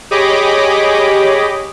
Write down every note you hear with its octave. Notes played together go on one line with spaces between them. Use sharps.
G4 G#4 C#5 D#5 B5 D6